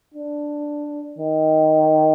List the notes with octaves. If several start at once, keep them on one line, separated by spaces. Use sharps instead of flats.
D4
D#3